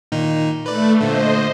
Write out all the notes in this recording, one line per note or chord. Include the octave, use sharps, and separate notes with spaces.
A#2 D#3 D#4
A3 B4 D5
A#2 D3 C5 D#5